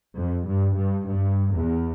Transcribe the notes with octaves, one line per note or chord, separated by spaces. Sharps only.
F2
G2
G2
G2
E2